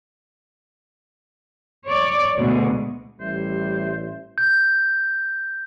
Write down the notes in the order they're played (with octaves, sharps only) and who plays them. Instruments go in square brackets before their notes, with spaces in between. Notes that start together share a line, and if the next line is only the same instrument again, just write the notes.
[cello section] C#5 D5
D2 B2 G#3
[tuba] A1 [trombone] G3 [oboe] C5 [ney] E5
[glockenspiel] G6